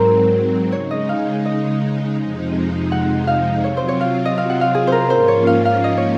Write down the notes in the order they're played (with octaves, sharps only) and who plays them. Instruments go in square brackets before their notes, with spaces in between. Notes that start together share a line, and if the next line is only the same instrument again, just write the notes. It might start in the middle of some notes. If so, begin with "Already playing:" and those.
Already playing: [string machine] G#2 F#3 C4 [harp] A#4 C5
[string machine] C#3 G#3 D#4 [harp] C#5
[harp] D#5
F5
D#5
[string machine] F2 C3 F3 G#3 D#4
[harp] F#5
F5
[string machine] C3 F#3 C4 F4 [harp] C#5
[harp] C5
C#5
F5
D#5
F5
F#5
F5
G#4
A#4 C5
[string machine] G#2 F3 A#3 C#4 F4 [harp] C5
[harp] C#5
F5
F5
D#5
C#5